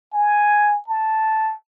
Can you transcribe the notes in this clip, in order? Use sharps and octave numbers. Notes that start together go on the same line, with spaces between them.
G#5
A5